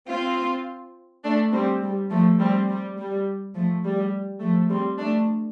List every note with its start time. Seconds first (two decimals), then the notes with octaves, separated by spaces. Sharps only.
0.09 C4 F4
1.24 A3 D4
1.53 G3 C4
1.82 G3
2.11 F3 A3
2.40 G3 C4
2.69 G3
2.97 G3
3.55 F3 A3
3.84 G3
4.41 F3 A3
4.70 G3 C4
4.99 A3 D4